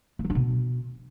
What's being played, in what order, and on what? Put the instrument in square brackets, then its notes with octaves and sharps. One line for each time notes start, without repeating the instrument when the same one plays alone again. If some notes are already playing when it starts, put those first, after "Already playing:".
[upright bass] A3
F3
D3
B2